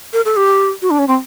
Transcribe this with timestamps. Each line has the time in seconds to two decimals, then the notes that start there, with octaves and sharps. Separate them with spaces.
0.13 A#4
0.25 A4
0.36 G4
0.82 F#4
0.90 D4
0.99 C#4
1.08 C4